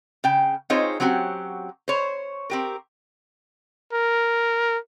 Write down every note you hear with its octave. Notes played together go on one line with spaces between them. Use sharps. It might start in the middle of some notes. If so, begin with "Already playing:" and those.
C#3 G5
C4 D#4 F4 G#4 C5 C#5
F#3 C4 C#4 F#4 G4
C5 C#5
C4 G4 A#4
A#4